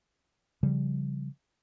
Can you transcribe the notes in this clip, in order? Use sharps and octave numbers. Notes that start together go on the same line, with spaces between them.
C#3 F3 G3